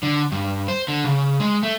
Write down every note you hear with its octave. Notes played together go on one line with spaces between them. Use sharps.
D3
G2
C5
D3
C#3
G#3
A3